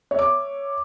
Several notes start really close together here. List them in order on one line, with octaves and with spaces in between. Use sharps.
C#5 E5 D6